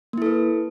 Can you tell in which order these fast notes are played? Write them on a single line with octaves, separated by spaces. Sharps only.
A#3 E4 A4 B4